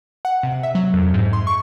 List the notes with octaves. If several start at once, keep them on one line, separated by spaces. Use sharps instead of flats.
F#5
C3
E5
F#3
F2
G#2
C6
C#6